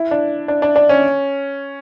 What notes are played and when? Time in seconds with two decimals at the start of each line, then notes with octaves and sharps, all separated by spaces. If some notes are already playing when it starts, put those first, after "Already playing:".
Already playing: E4
0.11 D4
0.48 D4
0.62 D4
0.76 D4
0.89 C#4